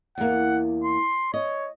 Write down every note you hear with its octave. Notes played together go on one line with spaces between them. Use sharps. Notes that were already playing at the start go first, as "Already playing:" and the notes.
E2 A#3 F#5
C6
C#5 D#5